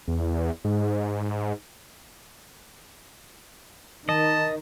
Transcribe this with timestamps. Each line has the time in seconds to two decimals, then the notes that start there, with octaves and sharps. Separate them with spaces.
0.08 E2
0.64 G#2
4.09 D#3 D#5 A5